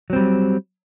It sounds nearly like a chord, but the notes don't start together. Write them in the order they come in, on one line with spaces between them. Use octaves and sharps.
F#3 C4 G3